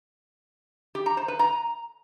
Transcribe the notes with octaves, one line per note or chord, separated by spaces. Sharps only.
G4
A#5
C5
B4
A#5